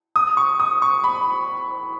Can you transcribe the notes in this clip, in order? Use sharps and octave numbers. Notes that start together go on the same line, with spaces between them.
D#6
C#6
D#6
C#6
B5